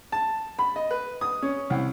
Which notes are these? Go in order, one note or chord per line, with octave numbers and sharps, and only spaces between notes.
A5
B5
D#5
B4
D#6
C#4
C2